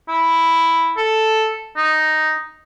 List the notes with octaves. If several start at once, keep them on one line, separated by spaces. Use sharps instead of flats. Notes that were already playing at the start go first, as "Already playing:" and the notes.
E4
A4
D#4